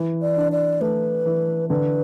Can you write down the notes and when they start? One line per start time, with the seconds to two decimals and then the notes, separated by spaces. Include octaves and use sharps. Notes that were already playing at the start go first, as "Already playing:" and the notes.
Already playing: E3
0.22 D5
0.37 D4
0.52 D5
0.81 A3 B4
1.25 E3
1.70 D3 B4